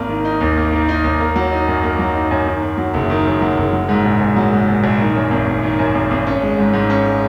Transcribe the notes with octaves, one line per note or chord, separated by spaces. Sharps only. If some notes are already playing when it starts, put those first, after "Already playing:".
Already playing: G#1 A#3
D#3
D#4
D#2
A#3
D#3
D#4
D#2
A#3
F#3
D#4
F#2
A#3
F#3
D#4
F#2
D#3
F#2
F#3
F#1
D#3
F#2
F#3
F#1
F#3
G#2
A#1
A#1
F#3
G#2
A#1
A#1
D#3
F#2
G#1
G#1
D#3
F#2
G#1
G#1
C#4
G#3
G#2
G#2
C#4
G#3